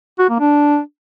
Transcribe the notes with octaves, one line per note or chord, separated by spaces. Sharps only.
F#4
A#3
D4